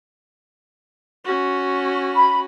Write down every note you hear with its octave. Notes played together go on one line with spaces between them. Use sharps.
C#4 F#4
B5